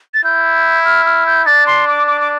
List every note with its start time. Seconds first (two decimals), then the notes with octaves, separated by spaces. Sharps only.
0.14 A6
0.24 E4 G6
0.84 F6
1.06 F6
1.27 G6
1.46 D4 A6
1.67 C6
1.88 D6
2.07 D6
2.21 D6